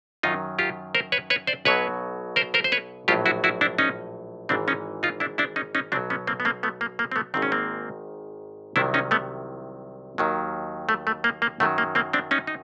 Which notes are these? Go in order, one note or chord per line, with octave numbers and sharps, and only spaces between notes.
F#2 D#3 F#3 D#4 F4
F4 G4
A#4 C5
B4 C#5
B4 C#5
C5 D5
B1 B2 F#3 B4 C#5
A#4 C5
A#4 C5
C5
B4 C#5
A#1 A2 F#3 F4 G4
E4 F#4
E4 F#4
D4 E4
C#4 D#4
G#1 G#2 E3 C4 D4
C#4 D#4
D#4 F4
D4 E4
D4 E4
C#4 D#4
C#4 D#4
B1 B2 F#3 C4 D4
B3 C#4
A#3 C4
B3
A#3 C4
A3 B3
A#3
A#3
C4
A3 B3
G#1 G#2 D#3 C4
C#4
A#3 C4
C2 C3 D#3 F#3 D4 E4
C#4 D#4
A3 B3
D#2 D#3 F#3
A3
A3
A#3
A#3
F#2 D#3 F#3 A3
A#3
A#3 C4
C4 D4
C#4 D#4
D#4